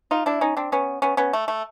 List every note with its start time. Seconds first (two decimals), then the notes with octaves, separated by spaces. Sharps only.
0.11 D#4 F4
0.26 D4 E4
0.41 C#4 D#4
0.57 C4 D4
0.72 B3 C#4
1.02 B3 C#4
1.17 B3 C#4
1.33 A3
1.48 A3